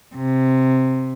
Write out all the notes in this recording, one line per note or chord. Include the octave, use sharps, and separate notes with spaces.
C3